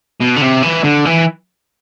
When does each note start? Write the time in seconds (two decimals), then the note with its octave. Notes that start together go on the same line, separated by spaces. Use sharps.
0.20 B2
0.36 D3
0.42 C3
0.63 E3
0.84 D3
1.05 E3